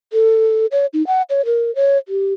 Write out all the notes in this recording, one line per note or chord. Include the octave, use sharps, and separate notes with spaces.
A4
C#5
D#4
F#5
C#5
A#4
C#5
G4